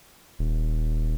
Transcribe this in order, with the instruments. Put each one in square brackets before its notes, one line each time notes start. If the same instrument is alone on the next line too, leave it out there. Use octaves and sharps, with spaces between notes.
[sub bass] D#1